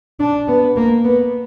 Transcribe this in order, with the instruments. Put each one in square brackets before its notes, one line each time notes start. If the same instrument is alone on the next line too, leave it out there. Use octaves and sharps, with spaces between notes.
[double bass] D4
B3
A#3
B3